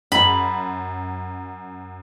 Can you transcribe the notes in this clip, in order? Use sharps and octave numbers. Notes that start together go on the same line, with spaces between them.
F#2 B5